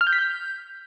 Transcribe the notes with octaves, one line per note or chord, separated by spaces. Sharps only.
F6
G6
B6
G6